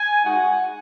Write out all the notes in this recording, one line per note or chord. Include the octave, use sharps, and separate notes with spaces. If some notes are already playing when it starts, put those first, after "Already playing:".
Already playing: G#5
G#3 D#4 F#4 F#5